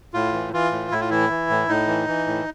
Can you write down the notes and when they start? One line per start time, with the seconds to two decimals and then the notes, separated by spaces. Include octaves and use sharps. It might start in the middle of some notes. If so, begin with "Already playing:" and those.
0.14 A2 F4
0.33 E3
0.53 E3 F4
0.72 A2
0.91 A2 E4
1.01 F4
1.10 E3 E4
1.30 E3
1.50 A2
1.68 A2 D#4
1.88 E3
2.07 E3
2.27 A2